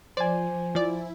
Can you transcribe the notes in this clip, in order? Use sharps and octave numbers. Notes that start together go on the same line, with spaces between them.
F3 C5 D5 G#5
F3 E4 D5